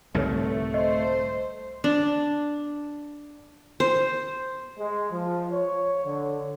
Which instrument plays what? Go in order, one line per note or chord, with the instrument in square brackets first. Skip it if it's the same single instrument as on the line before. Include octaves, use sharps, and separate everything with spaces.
[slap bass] C2 G#2 D3 [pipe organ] A3 [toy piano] A4 B4 C#5
[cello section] C5 [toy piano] D#5
[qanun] D4
C5
[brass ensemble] G#3
F3
C#5
D3